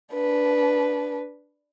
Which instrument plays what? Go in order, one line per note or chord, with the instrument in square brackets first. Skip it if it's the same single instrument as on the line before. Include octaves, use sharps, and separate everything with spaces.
[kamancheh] D4 B4